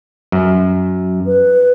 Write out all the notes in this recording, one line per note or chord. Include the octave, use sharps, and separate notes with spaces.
F#2
B4